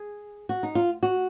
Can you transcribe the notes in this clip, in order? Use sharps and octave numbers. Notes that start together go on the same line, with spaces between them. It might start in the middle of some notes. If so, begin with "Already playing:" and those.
Already playing: G#4
F#4
D#4
F4
F#4